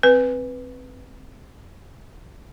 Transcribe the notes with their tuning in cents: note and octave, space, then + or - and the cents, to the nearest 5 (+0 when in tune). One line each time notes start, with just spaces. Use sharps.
C4 +0 B4 +0